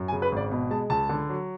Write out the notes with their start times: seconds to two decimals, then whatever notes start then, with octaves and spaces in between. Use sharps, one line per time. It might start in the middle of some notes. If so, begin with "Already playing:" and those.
Already playing: F#2
0.08 G#5
0.12 C#3
0.22 B4
0.32 G#1 D5
0.51 B2
0.70 G#3 A5
0.90 C#2 A5
1.09 D3
1.29 F#3